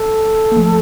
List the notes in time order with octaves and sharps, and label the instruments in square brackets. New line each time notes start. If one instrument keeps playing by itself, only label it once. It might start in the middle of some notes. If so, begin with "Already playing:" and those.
Already playing: [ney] A4
[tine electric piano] A#3
F3 A3